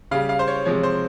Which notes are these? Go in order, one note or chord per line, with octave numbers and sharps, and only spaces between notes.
C#3 G3 F5
F5
C5
C#5
C3 F3 G#3 C#5
C5